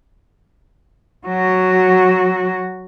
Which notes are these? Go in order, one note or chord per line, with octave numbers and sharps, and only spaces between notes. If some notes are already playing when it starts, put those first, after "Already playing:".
F#3 F#4